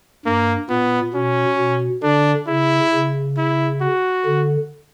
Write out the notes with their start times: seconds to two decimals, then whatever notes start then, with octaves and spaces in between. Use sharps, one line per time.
0.26 G2 A#3
0.69 A#2 B3
1.14 B2 C#4
1.58 B2
2.03 D3 D4
2.47 C#3 E4
2.93 C#3
3.37 E4
3.81 F#4
4.25 D3